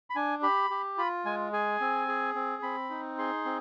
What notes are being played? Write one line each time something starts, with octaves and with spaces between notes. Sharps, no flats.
B5
D4 G#5
G4 B5
G4
F4 B5
G#3 G#5
G#4 G#5
C4
G#4
C4
C4 B5
D#4
G#4 C6
C4